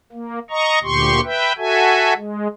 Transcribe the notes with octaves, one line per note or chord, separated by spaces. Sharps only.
A#3
D#5 A#5 C#6
D2 A#2 G4 C6 C#6
B4 E5 G5
F#4 A4 E5 G#5
G#3